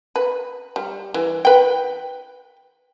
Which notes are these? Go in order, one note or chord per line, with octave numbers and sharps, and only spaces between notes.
B4
G3
E3
B4 G5